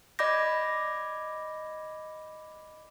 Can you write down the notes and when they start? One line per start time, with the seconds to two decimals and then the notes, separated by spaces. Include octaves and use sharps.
0.19 D5 D#5 B5 D6 G6 A#6